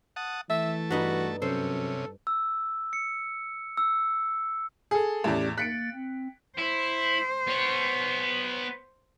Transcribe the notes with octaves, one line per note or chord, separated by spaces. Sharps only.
F#5 A5 D#6
E3 A3 E5 A5
G2 D#4 F#4 B4
F#2 C3 C#4 A4 C5
E6
C#7
E6
G#4 A4
E2 A2 C#4 G4 D5
A#3 F#6 A6 B6 C#7 D7
C4
E4 C5
B3 C#5